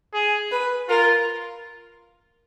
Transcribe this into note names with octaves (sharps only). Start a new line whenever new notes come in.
G#4
B4
F4 A#4